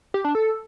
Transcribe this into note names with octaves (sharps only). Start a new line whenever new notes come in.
G4
D4
A4